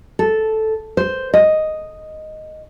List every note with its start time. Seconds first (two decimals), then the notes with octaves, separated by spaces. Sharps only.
0.19 A4
0.97 C5
1.34 D#5